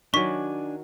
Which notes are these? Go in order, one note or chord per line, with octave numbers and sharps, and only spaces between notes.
D#3 F#3 D4 G#5 C#6 B6